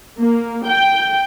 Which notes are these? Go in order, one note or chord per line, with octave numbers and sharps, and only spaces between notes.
A#3
G5